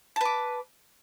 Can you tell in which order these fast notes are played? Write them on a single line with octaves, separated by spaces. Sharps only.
A5 B4 D6